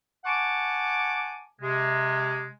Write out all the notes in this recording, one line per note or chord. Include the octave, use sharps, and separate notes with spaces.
F#5 G#5 A5 C#6 D6
C3 G#3